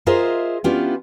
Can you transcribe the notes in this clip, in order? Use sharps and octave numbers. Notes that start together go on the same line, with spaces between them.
F4 G#4 A#4 C5 D#5 E5
B3 C#4 D4 E4 F4 G4